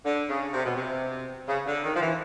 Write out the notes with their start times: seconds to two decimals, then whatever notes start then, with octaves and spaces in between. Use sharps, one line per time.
0.05 D3
0.29 C#3
0.52 C3
0.65 B2
0.75 C3
1.47 C#3
1.66 D3
1.84 D#3
1.95 F3
2.01 E3